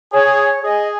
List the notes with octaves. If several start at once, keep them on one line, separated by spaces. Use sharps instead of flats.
G#4 C#5
G#4 D#5